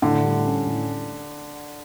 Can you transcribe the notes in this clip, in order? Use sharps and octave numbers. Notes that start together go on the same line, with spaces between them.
A2 D3
G3
C#4
A2